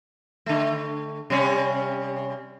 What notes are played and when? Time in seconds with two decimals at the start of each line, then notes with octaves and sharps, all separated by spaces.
0.46 D3 A3
1.30 C3 G3 C#4